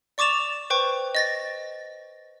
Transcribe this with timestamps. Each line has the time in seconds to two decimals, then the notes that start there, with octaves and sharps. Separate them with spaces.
0.18 D5 C#6 D6 A6 E7 F7
0.70 B4 C5 G5 C#6
1.15 D#5 A6 A#6